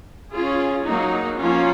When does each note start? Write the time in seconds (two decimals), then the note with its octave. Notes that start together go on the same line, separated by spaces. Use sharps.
0.32 C#4 F4 G#4
0.85 F#3 A#3 D#4
1.39 F3 A#3 C#4 F4